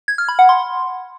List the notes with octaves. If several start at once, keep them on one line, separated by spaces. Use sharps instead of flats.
G#6
F6
B5
F#5
C6